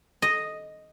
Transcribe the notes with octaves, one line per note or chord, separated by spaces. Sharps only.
D#5